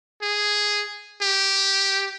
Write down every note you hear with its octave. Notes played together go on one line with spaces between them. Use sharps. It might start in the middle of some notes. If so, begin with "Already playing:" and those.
G#4
G4